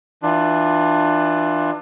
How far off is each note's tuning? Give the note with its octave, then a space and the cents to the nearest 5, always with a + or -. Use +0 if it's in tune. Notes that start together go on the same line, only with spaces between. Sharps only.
E3 -5 D4 +20 F4 +0